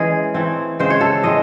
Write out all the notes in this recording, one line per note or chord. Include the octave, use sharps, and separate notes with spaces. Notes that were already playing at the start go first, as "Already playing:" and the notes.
Already playing: E3 G#3 C#4 G#4
E3 A3 C4
C#3 G#3 C4 C5
C#5
A4
A2 G#3 C4 D#5